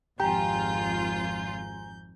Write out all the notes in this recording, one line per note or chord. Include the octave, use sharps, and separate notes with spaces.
G#1 F2 F4 G4 G#5 A#5 G6